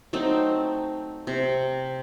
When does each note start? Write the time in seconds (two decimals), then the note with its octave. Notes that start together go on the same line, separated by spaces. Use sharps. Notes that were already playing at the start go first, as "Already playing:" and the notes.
0.13 F#3 A3 C4 D#4
1.27 C3